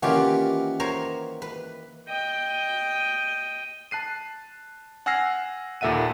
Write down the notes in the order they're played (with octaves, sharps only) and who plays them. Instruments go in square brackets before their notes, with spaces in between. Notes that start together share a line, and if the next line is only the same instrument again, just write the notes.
[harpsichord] D#3 E3 A#3 [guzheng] C#4 F4 G4 [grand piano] F#5 D6
[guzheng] A#4 C5 C#5
B4
[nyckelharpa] D#5 G5
[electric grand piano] A5 F#6 C7 D#7
F#5 G#5 E6 F6 A#6 C7
D#2 A#2 A4 E5 F#5 D#7